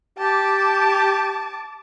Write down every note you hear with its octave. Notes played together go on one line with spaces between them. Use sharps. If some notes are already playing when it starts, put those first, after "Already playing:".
G4 A5 D6